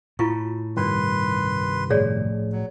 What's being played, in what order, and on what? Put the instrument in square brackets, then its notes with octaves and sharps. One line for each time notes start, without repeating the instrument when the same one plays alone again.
[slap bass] A2 [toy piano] E4 F4 C#6
[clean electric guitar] C2 G2 D#3 [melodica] B4 C6
[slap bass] A2 F3 [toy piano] G#4 C#5 D5
[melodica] F#3